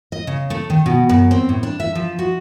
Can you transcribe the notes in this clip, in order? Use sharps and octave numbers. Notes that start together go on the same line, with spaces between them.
D#5
C#3
A3
D#3
B2
F#2
C4
A2
D4
E5
F3
F#4